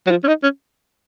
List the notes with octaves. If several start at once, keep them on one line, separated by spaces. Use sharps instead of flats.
F#3
F3
C#4
D#4
C#4